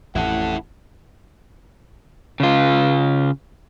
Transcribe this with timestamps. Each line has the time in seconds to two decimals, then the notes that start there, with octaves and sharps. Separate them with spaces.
0.15 A1 F2 E4 A4 F#5
2.40 C#3 F4